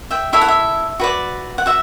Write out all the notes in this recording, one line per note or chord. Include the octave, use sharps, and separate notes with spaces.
E5 G5
E4 A4 C#5 E5
F#5
E5
F#4 B4 D5
F#5
F#4 E5